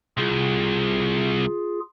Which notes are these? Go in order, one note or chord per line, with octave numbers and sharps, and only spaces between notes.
C2 F4 G#4